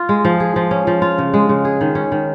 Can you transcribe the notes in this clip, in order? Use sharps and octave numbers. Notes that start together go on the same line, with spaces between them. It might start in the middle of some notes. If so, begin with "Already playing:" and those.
Already playing: F4
G#3
F3
G#4
F3
C#4
F3
F4
C#3
G#3
C#3
G#4
D#3
C#4
D#3